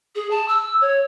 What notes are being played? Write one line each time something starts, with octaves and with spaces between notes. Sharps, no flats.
G#4
A5
E6
C#5